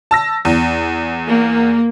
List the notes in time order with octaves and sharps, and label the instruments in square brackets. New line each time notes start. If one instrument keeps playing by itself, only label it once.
[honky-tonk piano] A5 E6 A#6
E2
[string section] A#3